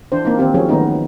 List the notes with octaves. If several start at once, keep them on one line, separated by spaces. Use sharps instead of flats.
E3 D4 C5
A#3 C4 D#4
D#3 C4 G4
F3 F#3 C#4 G#4
D#3 A3 B3 C#4 D#4